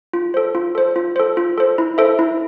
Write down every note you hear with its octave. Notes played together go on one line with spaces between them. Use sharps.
F4
A4 C5
F4
A4 C5
F4
A4 C5
F4
A4 C5
E4
A4 C5 E5
E4